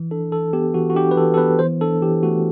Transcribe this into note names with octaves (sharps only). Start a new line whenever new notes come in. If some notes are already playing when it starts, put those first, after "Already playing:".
Already playing: E3
D4 A4
E3 A4
B3 G4
E3 F#4
F#4
D4 G4
B4
E3 A4
A4
B3 B4
E3 C5
D4 A4
E3 G4
A3 F#4